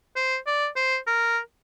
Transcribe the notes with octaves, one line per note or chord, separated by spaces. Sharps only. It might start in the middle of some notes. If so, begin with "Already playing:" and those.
C5
D5
C5
A#4